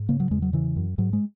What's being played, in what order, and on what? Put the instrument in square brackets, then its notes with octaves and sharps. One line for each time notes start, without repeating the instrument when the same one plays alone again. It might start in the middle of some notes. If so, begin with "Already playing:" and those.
Already playing: [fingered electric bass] G#2
C#3 A#3
F#3
E2 G#3
F#3
C#3 E3
F#2
G#2 F#3
G#3